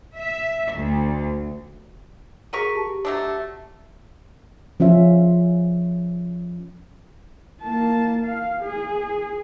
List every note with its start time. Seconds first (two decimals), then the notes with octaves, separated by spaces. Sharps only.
0.19 E5
0.74 D2
2.53 F#4 G#4 A#4 C#6 B6 D#7
2.76 G4 A5
3.05 F#3 A3 D4
4.80 F3 C#4 F4 E5
7.62 A#3 A5
8.25 F5
8.61 G#4